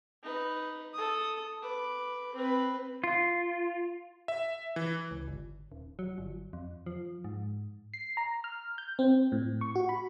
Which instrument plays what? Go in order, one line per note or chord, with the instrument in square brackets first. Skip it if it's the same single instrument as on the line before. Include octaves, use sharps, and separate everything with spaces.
[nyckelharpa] D#4 B4
A4 D#6
B4 D6
C4 B4
[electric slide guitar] F4
[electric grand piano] E5
E3
[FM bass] C#2
G1
D#1
F#3
G1
F2
F3
G#2
[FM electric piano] C7
A#5
F6
G6
C4
A2
C#6
F#4
B5